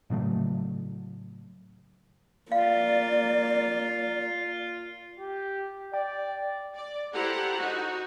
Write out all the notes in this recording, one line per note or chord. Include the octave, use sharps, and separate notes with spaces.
A2 C#3 F#3 A3
A#3 F4 D5 F5
G4
D5 G5
D5
E4 G4 A4 C5 F#5 A#5
D#4 F#4